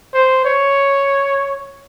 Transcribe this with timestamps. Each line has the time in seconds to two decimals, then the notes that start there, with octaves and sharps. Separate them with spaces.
0.14 C5
0.45 C#5